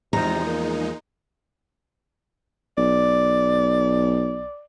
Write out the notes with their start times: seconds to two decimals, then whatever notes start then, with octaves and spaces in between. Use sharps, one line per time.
0.13 E2 C3 F3 G#3 D#4 A#5
0.45 A#3
2.78 B1 D5